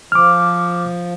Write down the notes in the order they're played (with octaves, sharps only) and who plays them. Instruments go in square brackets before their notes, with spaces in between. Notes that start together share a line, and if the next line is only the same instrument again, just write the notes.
[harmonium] F3 [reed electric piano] D6 F6